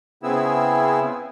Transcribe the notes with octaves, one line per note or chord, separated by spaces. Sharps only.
C#3 B3 C4 E4 G#4 E6